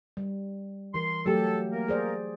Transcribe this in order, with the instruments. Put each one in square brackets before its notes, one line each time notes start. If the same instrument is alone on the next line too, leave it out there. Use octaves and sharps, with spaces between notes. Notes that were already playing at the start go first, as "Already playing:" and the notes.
[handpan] G3
[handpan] E3 A#4 [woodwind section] C6
[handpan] F#3 A3 G4 [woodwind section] A4
[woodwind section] A#3 A#4
[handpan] G#4 C5 D5